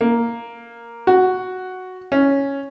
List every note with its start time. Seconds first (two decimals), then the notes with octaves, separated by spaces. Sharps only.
0.01 A#3
1.07 F#4
2.12 C#4